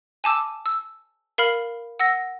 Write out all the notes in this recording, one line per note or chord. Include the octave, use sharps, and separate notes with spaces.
G#5 A5 D6 E6
E6
A#4 F5 B5 F6
F#5 E6 A#6